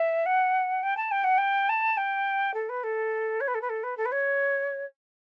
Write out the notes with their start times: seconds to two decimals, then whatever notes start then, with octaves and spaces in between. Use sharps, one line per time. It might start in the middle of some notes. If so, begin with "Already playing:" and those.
Already playing: E5
0.26 F#5
0.83 G5
0.97 A5
1.11 G5
1.24 F#5
1.38 G5
1.69 A5
1.97 G5
2.54 A4
2.69 B4
2.84 A4
3.41 C#5
3.48 B4
3.55 A4
3.62 B4
3.69 A4
3.83 B4
3.97 A4
4.05 B4
4.12 C#5